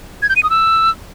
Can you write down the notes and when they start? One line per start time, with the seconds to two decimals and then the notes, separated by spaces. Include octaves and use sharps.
0.22 G#6
0.29 G6
0.36 D#7
0.43 D#6
0.50 E6